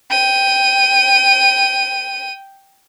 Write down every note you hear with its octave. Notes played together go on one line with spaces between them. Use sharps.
G5 D#7